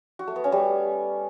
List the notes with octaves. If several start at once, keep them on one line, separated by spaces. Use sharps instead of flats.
F#4
A3
B3
C#4
G3